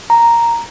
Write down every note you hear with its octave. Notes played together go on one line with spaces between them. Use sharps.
A#5